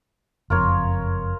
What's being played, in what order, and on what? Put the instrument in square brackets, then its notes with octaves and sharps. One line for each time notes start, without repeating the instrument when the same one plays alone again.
[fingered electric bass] F#1 F2 [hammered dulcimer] F4 A#4 C#5